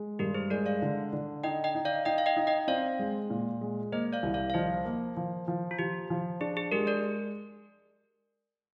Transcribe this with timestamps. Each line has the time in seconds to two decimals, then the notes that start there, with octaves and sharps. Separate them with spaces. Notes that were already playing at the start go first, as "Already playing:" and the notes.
Already playing: G#3
0.19 G2 G4 A#4
0.34 G#4 C5
0.50 G#3 A#4 D5
0.66 D5 F5
0.82 D3
1.13 D3
1.44 D#4 D#5 G5
1.64 D#5 G5
1.75 D#4
1.85 D5 F5
2.05 D#4 D#5 G5
2.18 F5
2.26 D#5 G5
2.37 D#4
2.47 D#5 G5
2.68 C4 D5 F5
2.99 G#3
3.30 A#2
3.61 G#3
3.92 A#3 C5 D#5
4.13 D5 F5
4.23 C2
4.34 D5 F5
4.50 F5
4.54 F3 C5 D#5
4.85 A#3
5.17 F3
5.48 F3
5.71 F4
5.79 F3 G4
6.10 F3
6.41 D4 G#4
6.57 G#4
6.72 G#3 G4 A#4
6.87 A#4 D5